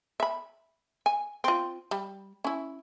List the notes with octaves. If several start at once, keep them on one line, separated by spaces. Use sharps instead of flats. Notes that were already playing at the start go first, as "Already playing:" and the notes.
E5 B5
G#5
C4 F4
G3
C#4 E4